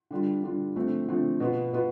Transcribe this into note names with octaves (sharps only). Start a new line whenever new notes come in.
D3 G3 D4 F4
D3 G3 D4 F4
D3 F3 A3 C4
D3 F3 A3 C4
B2 B3 F4
B2 B3 F4